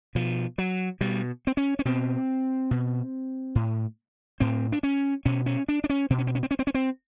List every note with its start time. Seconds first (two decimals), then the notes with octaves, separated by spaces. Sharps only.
0.15 B2 F3
0.58 F#3
1.01 B2 G3
1.47 C4
1.57 C#4
1.79 C#4
1.85 B2 C4
2.71 B2
3.55 A2
4.40 A2 C4
4.72 D4
4.83 C#4
5.25 B2 C#4
5.46 C#4
5.68 D4
5.84 D4
5.90 C#4
6.10 B2 C4
6.18 C#4
6.27 C4
6.35 C#4
6.43 C4
6.51 C#4
6.59 C4
6.67 C#4
6.74 C4